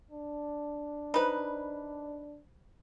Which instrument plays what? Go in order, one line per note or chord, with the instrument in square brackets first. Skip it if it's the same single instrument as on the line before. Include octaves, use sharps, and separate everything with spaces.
[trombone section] D4
[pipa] D#4 B4 [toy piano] C5 B5